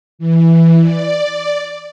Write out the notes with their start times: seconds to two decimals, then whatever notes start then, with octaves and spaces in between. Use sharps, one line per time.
0.19 E3
0.80 D5